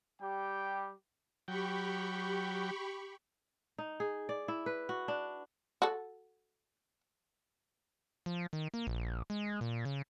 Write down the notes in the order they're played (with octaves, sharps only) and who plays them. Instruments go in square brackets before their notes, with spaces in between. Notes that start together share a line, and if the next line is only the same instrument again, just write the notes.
[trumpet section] G3 G4 G5
[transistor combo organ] F#3 G5 [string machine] G4 B5 C#6
[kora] D#4
G#4
D5
E4
B4
F#4
D4
[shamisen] F#4 A4
[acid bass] F3
D#3
A#3
A#1
G#3
A#2
C#3